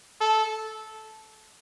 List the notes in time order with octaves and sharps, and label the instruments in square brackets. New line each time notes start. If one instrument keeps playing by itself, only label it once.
[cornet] A4